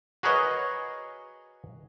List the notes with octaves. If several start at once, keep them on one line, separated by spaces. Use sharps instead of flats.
F#4 G#4 A#4 B4 C#5 D#5